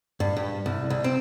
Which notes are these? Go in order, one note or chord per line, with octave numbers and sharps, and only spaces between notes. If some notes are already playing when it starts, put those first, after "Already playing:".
G2
G2
C2
C2
C4